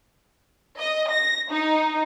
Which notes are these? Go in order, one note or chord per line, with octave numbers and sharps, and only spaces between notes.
D#5
A#6
D#4